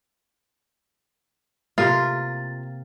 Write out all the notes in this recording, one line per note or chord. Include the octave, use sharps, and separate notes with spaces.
C3 A3 A#3 F4 A6